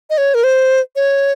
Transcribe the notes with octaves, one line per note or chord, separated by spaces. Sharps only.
D#5
C#5
A#4
C5
C#5